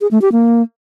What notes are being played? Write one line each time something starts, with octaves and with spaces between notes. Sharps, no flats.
G#4
A3
G4
A#3